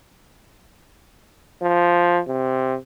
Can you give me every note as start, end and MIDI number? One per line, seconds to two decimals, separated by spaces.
1.61 2.20 53
2.27 2.76 48